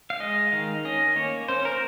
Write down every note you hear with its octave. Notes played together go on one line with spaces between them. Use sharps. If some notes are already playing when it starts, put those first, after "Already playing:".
F5
G#3 D#5
D#3 F5
C#4 D#5
A#3 C#5
C#4 C5
A#4